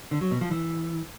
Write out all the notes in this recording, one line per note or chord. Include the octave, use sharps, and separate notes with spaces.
D3
F#3
B2
F3
E3